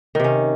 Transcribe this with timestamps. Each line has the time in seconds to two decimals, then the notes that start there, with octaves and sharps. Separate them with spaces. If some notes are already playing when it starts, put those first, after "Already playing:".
0.15 D#3
0.20 C3
0.24 C#4